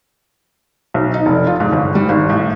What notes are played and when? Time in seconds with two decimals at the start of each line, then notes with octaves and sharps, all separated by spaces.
0.94 B1
1.14 D#4
1.26 F1
1.47 F4
1.60 G#2
1.72 G1
1.95 G3
2.09 G#1
2.30 A2